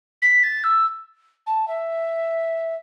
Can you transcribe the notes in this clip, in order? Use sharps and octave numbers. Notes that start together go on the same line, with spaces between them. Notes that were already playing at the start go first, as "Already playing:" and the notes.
B6
A6
E6
A5
E5